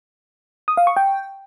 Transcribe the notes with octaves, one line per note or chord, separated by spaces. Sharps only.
D#6
F5
C#6
G5